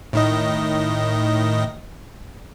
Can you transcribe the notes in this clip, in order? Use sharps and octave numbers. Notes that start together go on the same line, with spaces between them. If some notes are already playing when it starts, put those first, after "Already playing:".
A2 D#3 D#5